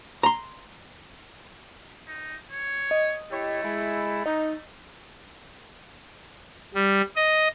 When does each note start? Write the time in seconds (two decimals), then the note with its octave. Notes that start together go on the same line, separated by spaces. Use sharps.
0.23 A#5 C6
2.07 D#4
2.51 C#5
2.91 D#5
3.32 A3 E4 G4 C#5
3.64 G#3 E4
4.26 D#4 D#5
6.75 G3
7.16 D#5